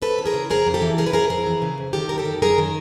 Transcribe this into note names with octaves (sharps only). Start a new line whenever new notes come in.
F2 A4 B4
E3
G#4 A#4
C#3
F2 G#4 A#4
F2
G4 A4
E3
C#3 G#4 A#4
B4
F2 G#4 A#4
F2 G#4 A#4
E3
C#3
F2
D#3 G4 A4
F#2 A#4
G4 A4
D#3
F#2 G#4 A#4
D#3